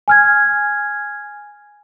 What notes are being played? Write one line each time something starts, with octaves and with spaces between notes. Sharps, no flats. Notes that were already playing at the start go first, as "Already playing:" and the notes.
G#5 F6 G#6